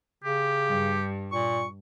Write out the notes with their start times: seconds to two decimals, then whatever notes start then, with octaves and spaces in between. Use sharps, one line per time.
0.24 C#3 G4
0.66 G2
1.32 A#2 C#6